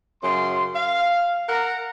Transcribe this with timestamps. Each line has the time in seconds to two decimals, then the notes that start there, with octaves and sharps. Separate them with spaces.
0.22 F#2 C#3 C6
0.76 F5
1.49 A#4 F#5 A#5